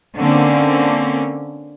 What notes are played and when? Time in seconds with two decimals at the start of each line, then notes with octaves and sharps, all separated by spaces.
0.17 D3 A#3 C4 C#4